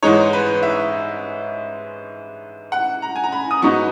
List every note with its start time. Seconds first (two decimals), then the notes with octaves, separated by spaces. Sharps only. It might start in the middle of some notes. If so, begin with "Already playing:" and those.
0.03 G#2 E3 G#3 D#4 C#5
0.33 B4
0.63 E5
2.72 F#5
3.02 A#5
3.16 G#5
3.24 A#5
3.32 B5
3.51 D#6
3.62 G#2 F#3 B3 D#4 C#6